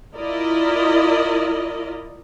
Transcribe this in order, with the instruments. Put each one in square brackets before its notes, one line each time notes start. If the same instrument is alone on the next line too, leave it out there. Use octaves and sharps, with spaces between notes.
[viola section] E4 F4 A#4 D5 D#5